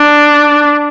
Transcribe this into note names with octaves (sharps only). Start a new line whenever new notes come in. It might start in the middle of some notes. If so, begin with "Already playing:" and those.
Already playing: D4